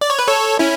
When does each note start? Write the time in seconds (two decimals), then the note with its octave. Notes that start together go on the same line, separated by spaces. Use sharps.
0.01 D5
0.10 C#5
0.19 B4
0.28 A4 C#5
0.59 C#4 E4